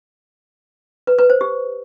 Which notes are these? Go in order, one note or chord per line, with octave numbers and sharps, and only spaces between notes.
B4
B4
C5
G4